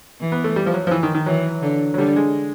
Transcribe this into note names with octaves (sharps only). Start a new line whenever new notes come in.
E3
B3
A3
G3
F3
F#3
F3
E3
D#3
D#3
E3 F#3
D3
F#3
D3 G3
G#3